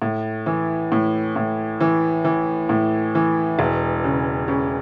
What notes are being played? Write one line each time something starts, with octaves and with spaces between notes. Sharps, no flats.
A2
E3
A2
A2
E3
E3
A2
E3
E1
C#3
C#3